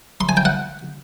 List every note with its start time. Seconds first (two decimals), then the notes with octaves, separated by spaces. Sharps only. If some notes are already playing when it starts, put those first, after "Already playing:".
0.21 C6
0.29 G#5
0.37 G5
0.45 F#5